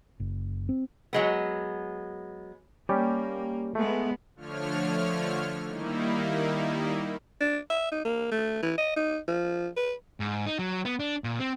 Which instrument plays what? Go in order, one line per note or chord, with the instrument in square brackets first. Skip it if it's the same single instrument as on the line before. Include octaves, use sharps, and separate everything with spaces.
[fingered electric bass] F#1
C4
[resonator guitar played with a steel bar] F#3 G#3 B3
[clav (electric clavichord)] G3 C#4 G4 [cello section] A#3
[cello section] G#3 B3 [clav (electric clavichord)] A3
[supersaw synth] D3 F3 A3 C#5 F6
D#3 G3 A#3 D#4 E4
[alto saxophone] D4
E5
D#4
A#3
A3
E3
D#5
D#4
F3
B4
[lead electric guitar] G#2
D#4
F#3
B3
D4
A#2
C4